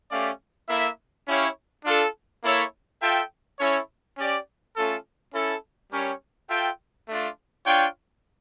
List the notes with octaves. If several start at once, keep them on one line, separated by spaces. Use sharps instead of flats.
A3 C#4 G4 D5 F5
A#3 E4 A4 E5
C#4 E4 G4 C#5 F5
D4 F4 A4
A#3 E4 A4 C#5 E5
F4 A4 E5 G5
C#4 E4 A4 C#5
C#4 G4 D5
A3 C#4 F4 A4
C#4 E4 A4
G3 C#4 G4 A#4 C#5
F4 A4 E5 G5
A3 D4 F4
D4 F4 C#5 G5